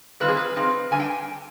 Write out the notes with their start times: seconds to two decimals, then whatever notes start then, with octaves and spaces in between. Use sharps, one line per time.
0.20 D#3 G3 C4 F4 B4
0.28 G#4
0.37 B4
0.56 F3 C4 D#4
0.91 D3 G3 D4 G#5
1.00 G5